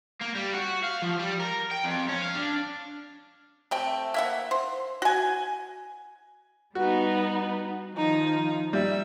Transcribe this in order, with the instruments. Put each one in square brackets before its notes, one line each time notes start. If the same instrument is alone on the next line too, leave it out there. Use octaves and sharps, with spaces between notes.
[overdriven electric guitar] A#3
G3
F#4
F5
F3
G3
A#4
G5
F2
C#4
F5
D4
[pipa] C3 A3 G5
A#3 E5 F#5
C5
F#4 G#5
[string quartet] G3 B3 D#4 [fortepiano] F#4
[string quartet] D#3 F3 D#4
[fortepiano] G3 [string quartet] E5